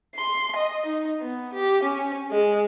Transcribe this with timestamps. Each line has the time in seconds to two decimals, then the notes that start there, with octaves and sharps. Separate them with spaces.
0.15 C6
0.56 D#5
0.86 D#4
1.21 B3
1.54 G4
1.84 C#4
2.31 G#3